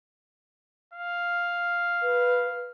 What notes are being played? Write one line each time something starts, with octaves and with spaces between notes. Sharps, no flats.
F5
B4